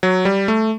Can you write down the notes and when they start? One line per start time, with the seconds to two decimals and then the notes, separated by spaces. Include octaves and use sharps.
0.03 F#3
0.25 G3
0.48 A3